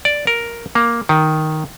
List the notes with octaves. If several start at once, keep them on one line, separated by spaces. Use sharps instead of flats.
D5
A#4
A#3
D#3